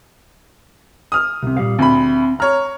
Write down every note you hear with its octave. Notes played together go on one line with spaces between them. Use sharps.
D#6 F6
C2 C3
A#2 G3 F5
D2 C4 B5
C#5 A#5 F6